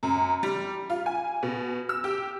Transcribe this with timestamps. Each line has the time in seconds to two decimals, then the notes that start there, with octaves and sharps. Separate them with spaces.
0.03 F#2
0.43 G3
0.90 F4
1.06 G#5
1.43 B2
1.89 E6
2.04 G4